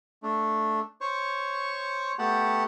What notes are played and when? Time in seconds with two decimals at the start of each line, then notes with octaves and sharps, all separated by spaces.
0.23 A3 D4
1.01 C5 C#5 C#6
2.19 A3 B3 G4 F#5 G5 A5